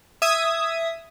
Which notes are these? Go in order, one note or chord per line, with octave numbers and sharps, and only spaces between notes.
E5 D#6 G#6